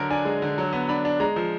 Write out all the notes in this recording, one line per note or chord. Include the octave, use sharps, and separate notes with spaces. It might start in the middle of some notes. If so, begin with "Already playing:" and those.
Already playing: D3 F#3 A#4
D4 G#5
G#3
D3
F#3
B3
D4 B5
D4
G#3 A#5
F3